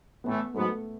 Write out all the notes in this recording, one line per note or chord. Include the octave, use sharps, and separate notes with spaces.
A2 E3 A3 B3
G#2 F#3 A3 B3